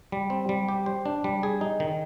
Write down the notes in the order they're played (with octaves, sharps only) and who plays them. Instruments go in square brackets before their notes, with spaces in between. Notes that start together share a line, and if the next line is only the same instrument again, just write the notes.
[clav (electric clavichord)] G3
C4
G3
G4
C5
D4
G3
G#4
D#4
D#3